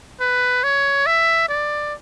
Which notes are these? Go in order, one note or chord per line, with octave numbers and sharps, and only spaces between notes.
B4
C#5
E5
D5